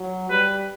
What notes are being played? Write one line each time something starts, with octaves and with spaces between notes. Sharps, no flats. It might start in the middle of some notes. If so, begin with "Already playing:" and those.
Already playing: F#3
G3 B4